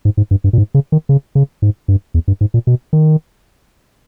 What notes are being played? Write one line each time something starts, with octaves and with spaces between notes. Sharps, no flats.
G#2
G#2
G2
G2
A#2
G#2
C#3
D#3
C#3
C#3
G#2
G2
E2
G2
G#2
A#2
B2
D#3